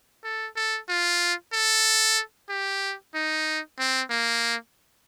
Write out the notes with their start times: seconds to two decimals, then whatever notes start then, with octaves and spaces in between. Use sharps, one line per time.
0.24 A4
0.56 A4
0.89 F4
1.53 A4
2.50 G4
3.15 D#4
3.79 C4
4.10 A#3